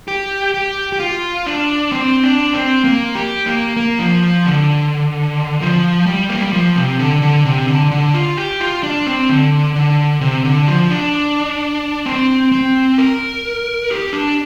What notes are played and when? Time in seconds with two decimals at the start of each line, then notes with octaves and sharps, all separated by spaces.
0.08 G4
0.54 G4
0.93 G4
1.00 F4
1.46 D4
1.92 C4
2.23 D4
2.54 C4
2.84 A#3
3.15 G4
3.46 A#3
3.77 A#3
3.99 F3
4.23 F3
4.46 D3
5.61 F3
6.07 G3
6.29 A#3
6.41 G3
6.53 F3
6.76 C3
6.99 D3
7.22 D3
7.45 C3
7.68 D3
7.91 D3
8.14 F4
8.37 G4
8.60 F4
8.83 D4
9.07 C4
9.29 D3
9.75 D3
10.21 C3
10.45 D3
10.68 F3
10.90 D4
12.06 C4
12.52 C4
12.98 A#4
13.90 G4
14.13 D4